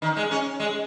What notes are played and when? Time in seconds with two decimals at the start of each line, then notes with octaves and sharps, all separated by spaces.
0.02 D#3
0.16 G#3
0.31 C#4
0.60 G#3